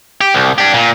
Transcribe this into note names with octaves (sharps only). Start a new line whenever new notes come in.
G4
C2
D4 G4
A#2